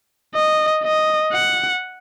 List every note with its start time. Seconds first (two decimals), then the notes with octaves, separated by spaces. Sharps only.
0.35 D#5
0.84 D#5
1.33 F#5